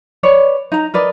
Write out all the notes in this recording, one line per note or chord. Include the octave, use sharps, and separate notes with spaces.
B4 C#5 D5
D#4 A#5
A#4 B4 D5 D#5